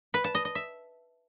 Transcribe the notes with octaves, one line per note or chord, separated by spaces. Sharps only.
B4
A5
D#5
D#5
E5